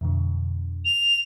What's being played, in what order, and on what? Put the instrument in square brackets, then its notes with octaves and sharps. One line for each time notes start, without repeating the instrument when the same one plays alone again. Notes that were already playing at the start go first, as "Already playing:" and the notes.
[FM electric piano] F2 B2 D3
[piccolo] F7